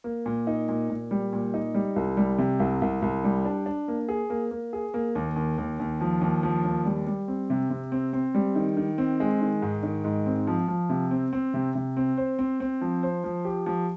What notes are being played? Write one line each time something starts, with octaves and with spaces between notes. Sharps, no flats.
A#3
A#2
D#4
A#2
A#2
G3
A#2
D#4
G3
C2
G3
C3
C2
C2
C2
G3
D4
D4
A#3
G#4
A#3
A#3
G#4
A#3
D#2
D#2
D#2
D#2
F3
D#2
F3
D#2
G3
G3
C4
C3
C3
C4
C4
G3
D#3
D#3
C4
G#3
D#3
G#2
D#3
G#2
C4
F3
F3
C3
C4
C4
C3
C3
C4
C5
C4
C4
F3
C5
F3
G4
F3